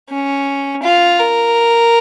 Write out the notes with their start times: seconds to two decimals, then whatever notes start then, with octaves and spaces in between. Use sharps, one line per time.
0.10 C#4
0.83 F4
1.19 A#4